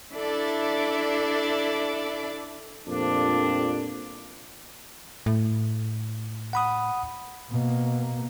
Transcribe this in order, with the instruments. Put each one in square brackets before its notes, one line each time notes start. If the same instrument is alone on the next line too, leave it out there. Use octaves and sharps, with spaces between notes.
[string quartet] D4 E4 A4 D5 E5
[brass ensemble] F2 A#2 F3 G3 A3 D4
[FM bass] A2
[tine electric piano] F#5 B5 D#6
[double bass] B2 A#3